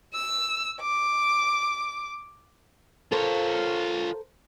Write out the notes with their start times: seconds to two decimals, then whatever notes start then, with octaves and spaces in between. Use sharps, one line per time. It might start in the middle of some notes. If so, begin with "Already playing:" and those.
0.14 E6
0.81 D6
3.12 F4 A4 A#4 C5 C#5